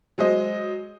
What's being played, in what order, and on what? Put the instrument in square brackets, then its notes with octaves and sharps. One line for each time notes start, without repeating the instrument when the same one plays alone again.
[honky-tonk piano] F#3 G#3 C5 D#5